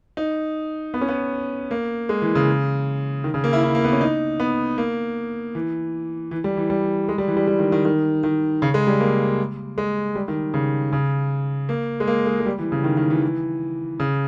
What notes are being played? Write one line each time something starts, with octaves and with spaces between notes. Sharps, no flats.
D#4
B3
C#4
B3
A#3
G#3
E3
C#3
D#3
C#3
A#3
E4
E4
A#3
B3
C#4
D#4
B3
A#3
E3
E3
G3
E3
G3
G#3
G3
E3
G3
G3
D#3
D#3
D#3
D#3
C#3
G#3
G3
A#3
G#3
G3
D#3
C#3
C#3
A#3
G#3
A#3
G#3
G#3
G3
E3
C#3
D#3
D#3
E3
E3
C#3